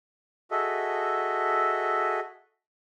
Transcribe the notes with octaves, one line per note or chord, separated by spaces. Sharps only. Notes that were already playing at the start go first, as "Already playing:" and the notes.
F#4 G#4 A4 D#5 E5